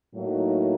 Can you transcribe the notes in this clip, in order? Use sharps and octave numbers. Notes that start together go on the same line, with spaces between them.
A2 F#3 A#3 D#4